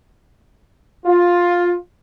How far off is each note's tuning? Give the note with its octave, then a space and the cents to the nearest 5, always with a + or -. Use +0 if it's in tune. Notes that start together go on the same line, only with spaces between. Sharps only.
F4 +10